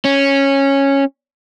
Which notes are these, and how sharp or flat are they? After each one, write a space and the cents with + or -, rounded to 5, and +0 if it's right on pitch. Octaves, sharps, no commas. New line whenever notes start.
C#4 -10